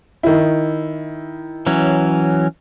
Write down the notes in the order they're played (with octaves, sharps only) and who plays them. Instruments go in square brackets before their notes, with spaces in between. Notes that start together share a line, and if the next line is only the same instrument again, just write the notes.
[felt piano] D#3 E4
[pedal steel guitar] E3 F#3 C#4